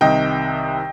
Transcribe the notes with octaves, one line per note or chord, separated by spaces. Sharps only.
C2 C3 D#3 D#5 G5